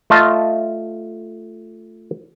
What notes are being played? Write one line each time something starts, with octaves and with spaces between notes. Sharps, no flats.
A3 F4 D#5 A5